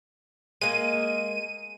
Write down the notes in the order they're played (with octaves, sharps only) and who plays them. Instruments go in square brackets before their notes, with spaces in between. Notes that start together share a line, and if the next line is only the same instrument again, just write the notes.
[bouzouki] G#3 A#3 [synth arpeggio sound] D#7